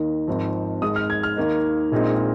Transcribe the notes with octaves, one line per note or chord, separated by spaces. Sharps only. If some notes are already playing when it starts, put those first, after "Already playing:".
Already playing: D#2 D#3 A#3 D#4
G#1 G#2 F3 C4
G#1 G#2 G#3 D#6
F6
G#6
F6
D#2 D#3 A#3 D#4
A#1 A#2 G#3 C4 D#4